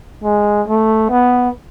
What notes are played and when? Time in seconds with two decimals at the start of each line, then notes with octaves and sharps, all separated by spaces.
0.24 G#3
0.67 A3
1.10 B3